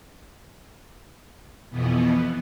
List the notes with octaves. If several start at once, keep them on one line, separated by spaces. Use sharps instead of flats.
F2 B2 E3 B3